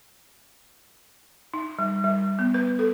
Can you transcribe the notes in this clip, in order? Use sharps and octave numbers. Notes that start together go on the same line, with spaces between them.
D#4
G3
G3
B3
B4
A4